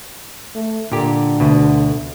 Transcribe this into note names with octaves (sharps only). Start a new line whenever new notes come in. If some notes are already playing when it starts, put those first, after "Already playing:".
A3
A#2 D3 G4
D2 B2